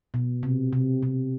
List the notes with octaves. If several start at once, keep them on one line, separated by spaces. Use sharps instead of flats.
B2
C3
C3
C3